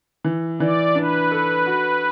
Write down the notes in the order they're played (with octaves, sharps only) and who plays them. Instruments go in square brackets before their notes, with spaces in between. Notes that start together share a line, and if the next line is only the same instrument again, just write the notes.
[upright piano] E3
[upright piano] E3 [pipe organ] D5
[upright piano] D4 [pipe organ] B4
[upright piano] A4
F#4